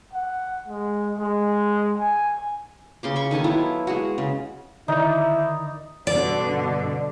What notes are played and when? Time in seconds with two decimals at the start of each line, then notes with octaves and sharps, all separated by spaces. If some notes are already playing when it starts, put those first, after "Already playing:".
0.13 F#5
0.67 G#3
1.18 G#3
1.98 G#5
3.03 C#3 C6 D6
3.16 B5 C#6
3.31 D#3 A4 G#5 A5
3.44 F#3 B3 E4 F4
3.87 G#3 F#4
4.18 C#3
4.88 D3 D#3 D#4 E4 D5
6.07 G2 B2 D3 D5